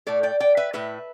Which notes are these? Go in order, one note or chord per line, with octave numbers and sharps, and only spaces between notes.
A2 A3 A4 D5
D5 G5
D5 G5
B4 E5
A2 A3 B4 E5